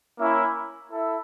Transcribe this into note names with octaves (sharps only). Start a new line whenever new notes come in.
A#3 C#4 E4
E4 A4